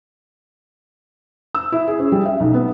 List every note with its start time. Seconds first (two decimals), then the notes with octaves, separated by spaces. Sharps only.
1.55 E6
1.72 E4
1.87 G#4
1.99 C#4
2.12 G3
2.25 E5
2.40 B1
2.54 B3